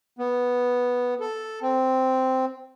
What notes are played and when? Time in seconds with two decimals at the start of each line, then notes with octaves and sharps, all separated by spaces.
0.19 B3
1.21 A4
1.62 C4